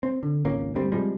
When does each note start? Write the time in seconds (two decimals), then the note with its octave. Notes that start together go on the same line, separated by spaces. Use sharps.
0.03 C4
0.23 D3
0.45 G#1 C#2 A#3 C#4
0.75 D2 G2 G3 C4
0.92 C3 F3 G3 G#3